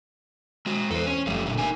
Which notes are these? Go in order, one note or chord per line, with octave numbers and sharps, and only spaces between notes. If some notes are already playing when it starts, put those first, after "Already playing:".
G#3 F#4
E2 A4 C5
C#4
F#1 F3 G3 A3
A#2 D3 A3
D#4 A#4 G#5